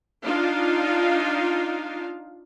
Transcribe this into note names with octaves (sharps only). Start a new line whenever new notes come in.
D4 D#4 F4 F5